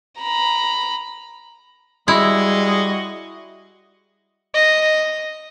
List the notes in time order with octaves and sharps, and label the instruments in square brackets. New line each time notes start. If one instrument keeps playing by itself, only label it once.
[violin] A#5 B5
[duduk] G3 [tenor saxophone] G#3 [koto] E4 [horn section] F#4 D#5
[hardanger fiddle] D#5